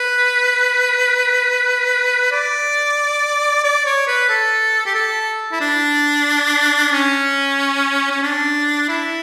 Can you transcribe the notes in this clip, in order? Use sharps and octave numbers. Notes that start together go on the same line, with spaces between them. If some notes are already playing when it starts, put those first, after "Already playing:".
Already playing: B4
D5
D5
C#5
B4
A4
G4
A4
E4
D4
C#4
C#4
D4
E4